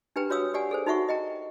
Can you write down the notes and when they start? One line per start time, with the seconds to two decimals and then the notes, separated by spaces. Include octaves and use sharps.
0.16 D4 G4 B4 G5 A#5
0.30 F#4 C#5 F5 D#6 E6
0.54 G4 D5 F#5 G#5
0.71 G#4 A4 C5
0.86 D#4 F#4 E5 F#5 C#6
1.09 D#5 G5 A#5